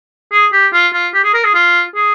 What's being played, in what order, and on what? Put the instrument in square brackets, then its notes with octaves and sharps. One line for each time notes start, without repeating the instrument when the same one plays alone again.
[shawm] G#4
G4
F4
F4
G4
G#4
A#4
G#4
F4
G#4